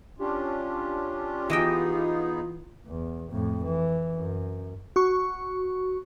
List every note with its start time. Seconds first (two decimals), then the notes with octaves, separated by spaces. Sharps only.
0.19 C#4 D4 F4 G4
1.50 E3 B3 D#4 F4 G#4 D#5 G5
2.87 E2
3.31 F2 A2
3.65 E3
4.17 F#2
4.96 F#4 C#6